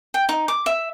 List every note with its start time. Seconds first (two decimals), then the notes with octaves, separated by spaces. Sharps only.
0.14 G5
0.29 D#4
0.48 D6
0.66 E5